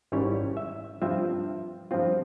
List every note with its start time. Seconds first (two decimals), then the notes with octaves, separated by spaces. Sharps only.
0.12 G#1 G#2 G3 C#4 E4 C#5
0.57 E5
1.02 G2 F3 C4 F4 E5
1.91 G2 F3 C4 F4